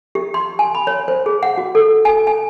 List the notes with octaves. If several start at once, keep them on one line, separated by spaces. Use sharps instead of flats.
G4
C6
G#5
B5
C#5
C5
G#4
F#5
F#4
A4
G#5
G#5